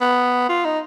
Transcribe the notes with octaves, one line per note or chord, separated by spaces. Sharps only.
B3
F4
D#4